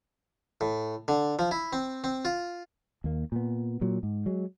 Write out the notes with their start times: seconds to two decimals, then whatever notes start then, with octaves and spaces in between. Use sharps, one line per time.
0.61 A2
1.08 D3
1.39 F3
1.51 E4
1.73 C4
2.04 C4
2.25 F4
3.04 D#2 A#3
3.32 A#2 B3
3.81 A#2 F#3
4.03 G#2
4.26 F#3 G#3